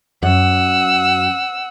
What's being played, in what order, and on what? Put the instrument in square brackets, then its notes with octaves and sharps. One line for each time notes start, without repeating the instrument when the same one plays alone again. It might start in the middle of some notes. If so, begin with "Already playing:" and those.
[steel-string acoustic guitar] F#2 [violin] F#5 E6